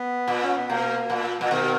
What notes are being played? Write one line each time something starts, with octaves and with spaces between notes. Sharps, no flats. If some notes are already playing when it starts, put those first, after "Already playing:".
Already playing: B3
A#2
C#4
B3
B2 A#3
A#2
A#2
B2 D#3